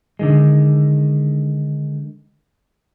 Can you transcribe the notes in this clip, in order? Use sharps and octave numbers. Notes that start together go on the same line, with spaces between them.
D3 D#3 G#3